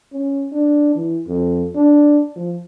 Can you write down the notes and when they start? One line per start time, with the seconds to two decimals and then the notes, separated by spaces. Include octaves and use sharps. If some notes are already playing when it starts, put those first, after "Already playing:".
0.13 C#4
0.53 D4
0.96 E3
1.27 F2
1.76 D4
2.36 F3